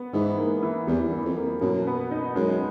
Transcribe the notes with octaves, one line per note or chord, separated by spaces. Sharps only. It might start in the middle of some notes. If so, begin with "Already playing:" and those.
Already playing: B3
G#2 E3
A#3
E3
E2 G3
E3
F2
A#3
F#2 B2
B3
D#4
F#2 G#3